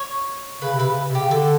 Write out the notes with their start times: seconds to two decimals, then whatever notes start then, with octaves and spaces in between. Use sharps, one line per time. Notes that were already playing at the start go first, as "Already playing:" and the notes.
Already playing: C#5
0.62 C#3 B4
0.75 C3 B4
0.88 C#3
1.08 C3
1.15 C#3 G4
1.31 D3 A4